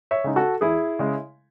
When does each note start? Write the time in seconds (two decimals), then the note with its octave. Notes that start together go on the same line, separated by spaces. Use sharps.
0.11 C#5 E5
0.24 C#3 G#3 D#4
0.36 F#4 A4
0.61 E2 E4 G#4
0.99 C#3 G#3